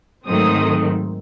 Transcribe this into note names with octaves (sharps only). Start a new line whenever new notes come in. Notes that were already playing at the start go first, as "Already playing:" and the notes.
G#2 D#3 F#3 A3 C4 D#6